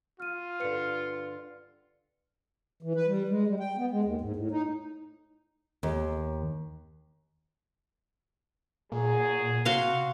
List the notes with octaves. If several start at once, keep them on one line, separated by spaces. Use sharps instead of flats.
F4 F6 D#7
G2 D3 B4 F6 C#7
E3
B4
G3
G#3
G3
G5
B3
G#3
D#2
G#2
A2
D#4
D#2
A#2 F#3 G#4
C3 F#4 F5 C6